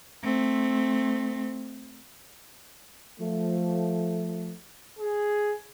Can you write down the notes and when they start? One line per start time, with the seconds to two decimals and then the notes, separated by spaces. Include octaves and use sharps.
0.22 A3 C4
3.20 F3 A3
4.99 G#4